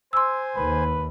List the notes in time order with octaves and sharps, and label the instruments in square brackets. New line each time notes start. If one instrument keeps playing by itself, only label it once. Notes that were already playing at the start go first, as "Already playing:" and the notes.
[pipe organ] C5 G#5 [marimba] C6 E6
[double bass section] D#2 [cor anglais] B4